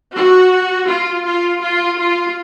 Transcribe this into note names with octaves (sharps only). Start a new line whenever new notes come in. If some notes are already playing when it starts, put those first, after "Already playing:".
F#4
F4
F4
F4
F4